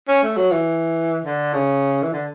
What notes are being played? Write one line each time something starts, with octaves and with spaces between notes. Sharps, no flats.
C#4
A3
F#3
E3
D3
C#3
E3
D3